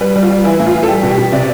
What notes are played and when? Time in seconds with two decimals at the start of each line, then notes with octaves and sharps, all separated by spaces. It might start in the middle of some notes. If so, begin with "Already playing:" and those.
0.01 G3 B4
0.16 G3
0.23 F4
0.30 G3
0.44 E3 E4
0.60 A2
0.66 F4
0.74 E3
0.83 A4
0.88 G3 G4
1.03 B2
1.10 G4
1.18 B2
1.32 C3 D5